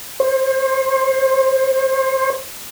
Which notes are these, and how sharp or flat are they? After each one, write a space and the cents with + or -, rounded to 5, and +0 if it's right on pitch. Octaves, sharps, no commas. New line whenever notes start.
C5 +30